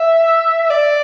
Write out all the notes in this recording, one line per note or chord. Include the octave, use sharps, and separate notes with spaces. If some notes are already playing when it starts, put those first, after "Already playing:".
Already playing: E5
D5